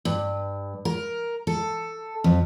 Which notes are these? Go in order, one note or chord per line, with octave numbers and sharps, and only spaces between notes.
G2
A#4
A4
F2